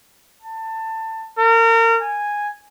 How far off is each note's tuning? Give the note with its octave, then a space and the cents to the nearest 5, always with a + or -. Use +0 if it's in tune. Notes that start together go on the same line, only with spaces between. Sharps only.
A5 +20
A#4 -30
G#5 -5